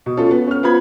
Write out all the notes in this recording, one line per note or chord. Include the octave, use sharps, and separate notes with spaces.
B2
A3 C#4 F4 A4
B3
C#4 F6
B3 F4 C5 B5 G#6